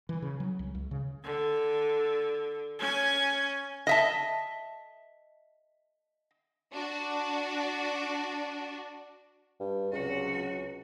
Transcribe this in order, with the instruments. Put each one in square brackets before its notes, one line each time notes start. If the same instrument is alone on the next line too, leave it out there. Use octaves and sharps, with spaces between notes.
[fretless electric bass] E3
C#3
F#3
C2
C#2
C#3
[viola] D3
C#4 G#5
[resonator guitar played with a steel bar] D#5 E5 A5
[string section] D4 F#4
[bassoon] G2
[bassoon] C#2 [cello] C3 F#4 [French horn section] F#3 C#4